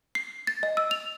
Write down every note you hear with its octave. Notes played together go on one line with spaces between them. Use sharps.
C7
A6
D#5
E6
F7